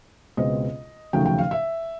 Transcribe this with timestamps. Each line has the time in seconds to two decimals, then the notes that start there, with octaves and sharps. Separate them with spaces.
0.37 C#2 B2 G#3 C4 D#5
1.13 F1 D#2 C#3 F#3 A3 G5
1.26 G5
1.38 F5
1.51 E5